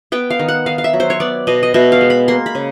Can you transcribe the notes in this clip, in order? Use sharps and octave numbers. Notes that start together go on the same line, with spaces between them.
B3 G5
F5
D#3
F#5
D#3 F5
F5
E5
F#3
C5
C#5
B3 D5
B2 D#5
D#5
B2 E5
F5
G#3
B5
A#3 C6
B5
C#3